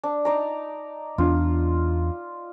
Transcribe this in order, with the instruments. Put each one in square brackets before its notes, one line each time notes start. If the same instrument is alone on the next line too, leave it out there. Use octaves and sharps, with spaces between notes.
[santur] D4
D#4 D5 A#5
[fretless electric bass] E2 D4 [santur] F4